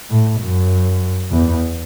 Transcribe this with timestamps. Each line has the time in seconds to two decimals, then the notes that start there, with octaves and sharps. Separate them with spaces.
0.10 A2
0.40 F#2
1.31 E2